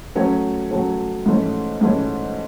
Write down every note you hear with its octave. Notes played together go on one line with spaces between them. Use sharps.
F#3 A3 C#4
F#3 A3 C#4
G#2 E3 A3 C#4
G#2 E3 A3 C#4